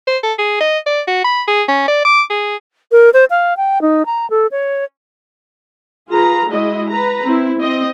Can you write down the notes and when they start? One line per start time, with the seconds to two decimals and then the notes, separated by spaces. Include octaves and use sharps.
0.07 C5
0.23 A4
0.38 G#4
0.61 D#5
0.86 D5
1.08 F#4
1.24 B5
1.48 G#4
1.68 C#4
1.88 D5
2.05 D6
2.30 G#4
2.92 A#4
3.14 C5
3.30 F5
3.57 G5
3.82 D#4
4.06 A#5
4.30 A4
4.51 C#5
6.09 F4 G#4 B4 A#5
6.49 G#3 E4 F#4 D#5
6.89 B4 A#5
7.24 C4 E4
7.59 C4 D#5